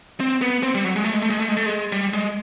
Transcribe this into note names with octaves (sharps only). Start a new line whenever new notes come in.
C4
B3
C4
G3
F#3
G#3
A3
G#3
A3
G#3
A3
G#3
A3
G#3
G3
G#3